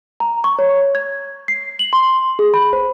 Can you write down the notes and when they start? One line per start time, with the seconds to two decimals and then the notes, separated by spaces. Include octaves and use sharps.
0.20 A#5
0.44 C#6
0.59 C#5
0.95 G#6
1.48 C7
1.79 F#7
1.93 C6
2.39 G#4
2.54 B5
2.73 C5